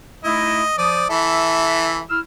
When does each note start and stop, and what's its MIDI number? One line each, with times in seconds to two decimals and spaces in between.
0.24 0.62 57
0.24 0.62 63
0.24 0.62 64
0.24 0.76 75
0.78 1.06 53
0.78 1.05 74
0.78 1.06 87
1.10 2.03 52
1.10 2.03 69
1.10 2.00 76
2.10 2.19 64
2.10 2.19 88
2.10 2.19 89